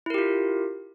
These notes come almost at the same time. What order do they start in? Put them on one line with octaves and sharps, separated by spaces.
E4 A#4 G4 F4